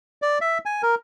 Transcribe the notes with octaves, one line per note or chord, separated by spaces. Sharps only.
D5
E5
G#5
A#4